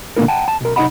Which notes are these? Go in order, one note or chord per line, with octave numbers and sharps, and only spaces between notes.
A#2 D3 A#3 B3 E4 A#4
F#5 G5 A5
A5
B1 A#4
C2 D#4 D#5 F5 F#5 B5